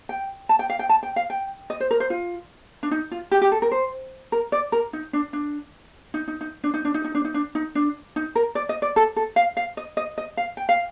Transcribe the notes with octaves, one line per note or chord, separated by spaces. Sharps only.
G5
A5
G5
F5
G5
A5
G5
F5
G5
D#5
C5
A#4
C5
F4
D4
D#4
F4
G4
G4
A4
A#4
C5
A#4
D5
A#4
D#4
D4
D4
D#4
D#4
D#4
D4
D#4
D4
D#4
D#4
D4
D#4
D4
D#4
D4
D#4
A#4
D5
D#5
D5
A4
A4
F5
F5
D#5
D#5
D#5
F5
G5
F5